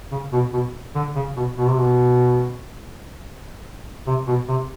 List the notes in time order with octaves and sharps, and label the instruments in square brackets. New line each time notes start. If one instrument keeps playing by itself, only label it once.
[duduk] C#3
B2
B2
D3
C#3
B2
B2
C3
B2
C3
B2
C3